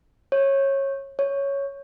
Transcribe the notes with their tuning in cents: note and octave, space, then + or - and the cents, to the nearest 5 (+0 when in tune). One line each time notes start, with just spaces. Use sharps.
C#5 -20
C#5 +5